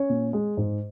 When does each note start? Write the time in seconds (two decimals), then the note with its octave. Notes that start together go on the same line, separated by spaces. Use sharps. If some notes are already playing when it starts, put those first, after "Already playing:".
Already playing: C#4 C#5
0.09 A#2
0.33 G#3
0.57 G#2